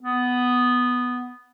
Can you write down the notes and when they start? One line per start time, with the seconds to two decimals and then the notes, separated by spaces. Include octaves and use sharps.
0.03 B3